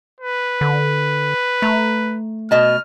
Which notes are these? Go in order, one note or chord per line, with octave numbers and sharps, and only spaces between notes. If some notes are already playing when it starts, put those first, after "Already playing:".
B4
D3
A3 A#5
B2 D#5 A5 F6